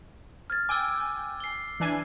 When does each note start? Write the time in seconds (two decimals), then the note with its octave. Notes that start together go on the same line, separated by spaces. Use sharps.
0.50 F6 G#6 A6
0.69 G5 G#5 D6 E6
1.40 C7 G7
1.80 E3 D4 G#5